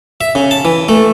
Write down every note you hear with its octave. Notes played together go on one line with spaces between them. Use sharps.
E5
C#3
A5
E3
A3